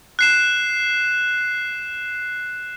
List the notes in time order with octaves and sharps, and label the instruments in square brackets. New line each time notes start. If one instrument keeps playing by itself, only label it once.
[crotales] F#6 C7 E7